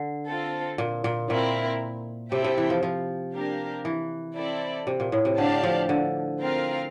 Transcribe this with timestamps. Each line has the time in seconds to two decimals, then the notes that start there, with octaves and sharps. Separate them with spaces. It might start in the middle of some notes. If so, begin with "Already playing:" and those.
Already playing: D3
0.27 C4 F4 A4
0.78 A#2
1.04 A#2
1.30 A#2 C4 E4 A#4
2.32 C3 C4 E4 A4 E5 G5
2.44 C3
2.58 E3
2.70 F3
2.83 F3
3.33 A#3 D4 G4 A#4
3.85 E3
4.36 C4 E4 A4 D5
4.87 C3
5.00 A#2
5.12 A2
5.25 C3
5.38 D3 D4 G4 D5 F5 A5
5.63 F3
5.89 D3
6.40 C4 F4 A#4 F5